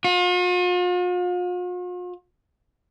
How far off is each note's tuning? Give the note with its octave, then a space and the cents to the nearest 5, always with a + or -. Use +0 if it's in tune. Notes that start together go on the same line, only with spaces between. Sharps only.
F4 +45